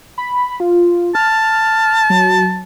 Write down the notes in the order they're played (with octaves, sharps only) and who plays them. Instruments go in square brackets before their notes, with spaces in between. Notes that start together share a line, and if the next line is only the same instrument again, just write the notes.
[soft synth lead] B5
F4
[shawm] A5 [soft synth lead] F6
[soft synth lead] F#3